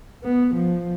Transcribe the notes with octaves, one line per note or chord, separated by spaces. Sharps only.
B3
F3